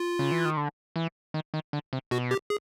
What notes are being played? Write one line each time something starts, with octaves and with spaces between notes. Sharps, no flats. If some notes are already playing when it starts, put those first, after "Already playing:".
Already playing: F4
C#3
E3
D#3
D3
E3
D#3
D#3
D3
C3
B2 F#4
G4
G#4